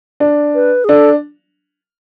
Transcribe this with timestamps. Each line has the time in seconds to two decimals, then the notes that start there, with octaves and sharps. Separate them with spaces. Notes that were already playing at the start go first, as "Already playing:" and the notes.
0.20 D4
0.55 B4
0.85 G#4
0.89 D4 A4